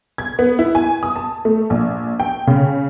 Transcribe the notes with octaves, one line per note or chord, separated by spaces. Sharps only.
G#6
B3
E4
G#5
D#6
A5
A3
A#1
G5
C#3